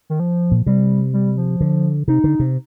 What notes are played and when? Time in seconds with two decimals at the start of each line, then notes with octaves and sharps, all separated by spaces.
0.10 D#3
0.20 F3
0.51 A#2
0.66 C3 G3
1.14 G3
1.37 F3
1.61 D3
2.08 C3 D#4
2.24 D3
2.40 C3